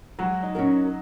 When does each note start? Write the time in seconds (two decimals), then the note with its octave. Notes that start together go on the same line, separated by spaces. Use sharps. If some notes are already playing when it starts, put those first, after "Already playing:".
0.19 F#3 G#3 F#4
0.43 D#4
0.55 C#4 F#4 A#4
0.67 D#4